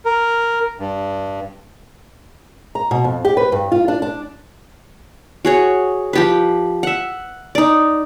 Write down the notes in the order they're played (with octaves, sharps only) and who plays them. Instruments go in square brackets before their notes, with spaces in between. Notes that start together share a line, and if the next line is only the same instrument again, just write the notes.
[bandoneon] A#4
G2
[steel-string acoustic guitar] A#5
B2
F2
G4
B4
G2
F4
D4
D4
[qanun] F#4 G#4 C#5
F3 G4 B4
E5 F#5
D#4 D5